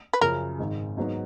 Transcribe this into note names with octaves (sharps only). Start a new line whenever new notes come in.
B4
F#2 C#3 F3 A#4
G#1 G#2 D#3
G#2 F#3 B3 D#4